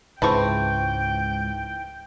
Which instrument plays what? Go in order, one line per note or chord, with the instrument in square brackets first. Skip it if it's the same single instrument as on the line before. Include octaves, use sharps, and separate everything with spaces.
[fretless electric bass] C#2 G#2 [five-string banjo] E3 C4 [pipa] F3 A5 C#6 [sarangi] G5